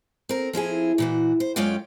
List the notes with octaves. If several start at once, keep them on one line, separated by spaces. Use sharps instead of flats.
C4 A#4
F3 C4 E4 G#4
A#2 E3 F#4
C5
F#2 G#3 C#4 F4 D5 G5